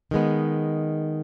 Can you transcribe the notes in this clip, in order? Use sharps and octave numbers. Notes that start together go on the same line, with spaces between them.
D#3 G#3 B3